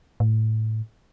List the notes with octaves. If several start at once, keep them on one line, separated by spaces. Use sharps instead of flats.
A2